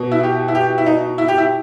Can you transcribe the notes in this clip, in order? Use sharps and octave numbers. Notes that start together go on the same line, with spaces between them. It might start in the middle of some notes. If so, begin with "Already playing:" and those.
Already playing: B2
E4
G4
E4
G4
E4
D#4
E4
G4
E4